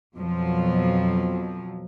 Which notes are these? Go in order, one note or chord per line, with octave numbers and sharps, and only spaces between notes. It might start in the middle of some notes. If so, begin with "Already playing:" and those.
F2 B2 F3 F#3